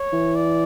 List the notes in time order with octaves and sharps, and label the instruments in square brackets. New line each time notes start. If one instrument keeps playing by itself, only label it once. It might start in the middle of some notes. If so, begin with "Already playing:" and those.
Already playing: [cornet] C#5
[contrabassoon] E3
[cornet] D5